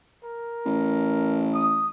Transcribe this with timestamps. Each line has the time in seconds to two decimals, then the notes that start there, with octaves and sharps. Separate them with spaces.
0.24 A#4
0.65 A1
1.54 D#6